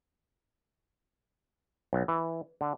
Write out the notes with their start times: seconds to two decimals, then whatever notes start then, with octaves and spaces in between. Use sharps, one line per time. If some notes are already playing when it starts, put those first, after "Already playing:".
1.93 B1
2.08 E3
2.61 D3